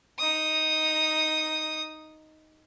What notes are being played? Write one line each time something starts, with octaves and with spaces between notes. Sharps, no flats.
D#4 D#6